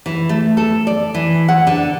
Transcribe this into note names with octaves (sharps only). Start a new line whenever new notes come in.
E3
A3
A4
D5
E3
F#5
D3